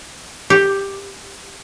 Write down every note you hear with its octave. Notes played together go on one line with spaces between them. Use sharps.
G4